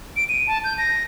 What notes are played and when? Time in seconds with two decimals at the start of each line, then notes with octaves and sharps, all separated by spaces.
0.16 D7
0.29 D#7
0.47 A5
0.64 G6
0.78 A#6